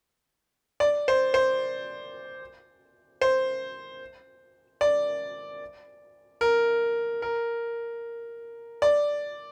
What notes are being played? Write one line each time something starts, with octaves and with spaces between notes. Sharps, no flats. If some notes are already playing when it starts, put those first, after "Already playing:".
D5
C5
C5
C5
D5
A#4
A#4
D5